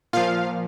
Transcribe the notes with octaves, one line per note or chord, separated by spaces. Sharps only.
A#2 F3 F4 F5